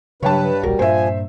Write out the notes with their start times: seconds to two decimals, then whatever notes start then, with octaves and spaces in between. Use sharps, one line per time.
0.22 G2 C#3 F#3 B4 C#5 G5 A5
0.63 D1 A#1 G3 F#4 A#4
0.79 G2 A#2 F3 C5 E5 G#5